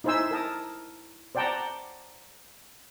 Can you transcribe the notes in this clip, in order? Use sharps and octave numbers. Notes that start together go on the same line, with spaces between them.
D#4 E4 C5 E5 G#5 E6
A#4 A5 D#6
C5 D5 F#5 G5 A5 A#5